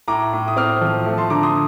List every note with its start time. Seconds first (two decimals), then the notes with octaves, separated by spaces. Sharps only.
0.08 A2 A#5 D6
0.33 A2
0.48 D#6
0.57 C4 D6 F6
0.81 F3
1.06 A3
1.18 A5 C6
1.30 D3 A#5 D6
1.43 C6 D#6